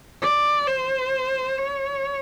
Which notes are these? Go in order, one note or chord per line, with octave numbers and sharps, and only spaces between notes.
D5
C5
C#5